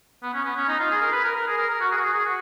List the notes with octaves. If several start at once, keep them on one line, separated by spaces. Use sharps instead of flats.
B3
C#4
B3
C#4
D#4
F4
G#4
A#4
B4
A#4
A#4
G#4
A#4
A#4
F#4
G#4
F#4
G#4
G#4
F#4